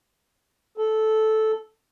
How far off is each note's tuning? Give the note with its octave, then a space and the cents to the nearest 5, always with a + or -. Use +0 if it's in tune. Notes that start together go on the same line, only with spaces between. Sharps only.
A4 -10